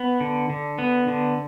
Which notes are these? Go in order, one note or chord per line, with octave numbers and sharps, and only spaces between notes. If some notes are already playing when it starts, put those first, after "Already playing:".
Already playing: B3
D3
D3
B3
D3